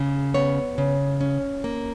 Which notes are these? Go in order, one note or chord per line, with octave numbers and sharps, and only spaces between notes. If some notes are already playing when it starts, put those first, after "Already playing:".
Already playing: C#3
B3 C#5
C#3
C#4
A#3